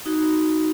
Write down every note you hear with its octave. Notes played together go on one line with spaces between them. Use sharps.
D#4 F#4